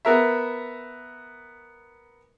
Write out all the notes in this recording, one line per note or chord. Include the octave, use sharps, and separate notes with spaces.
B3 A#4 E5